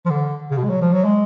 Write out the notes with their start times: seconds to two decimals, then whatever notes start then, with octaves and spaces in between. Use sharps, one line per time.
0.06 F3
0.10 D3
0.51 C#3
0.58 B2
0.64 G#3
0.69 F#3
0.81 F3
0.92 F#3
1.04 G#3